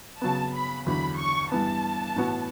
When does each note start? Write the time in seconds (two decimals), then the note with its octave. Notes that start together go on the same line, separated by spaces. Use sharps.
0.21 C#3 F#3 B3 A5
0.54 B5
0.86 E2 D3 F#3 B5
1.19 C#6
1.52 G2 E3 B3 A5
2.16 A2 E3 B3 F#4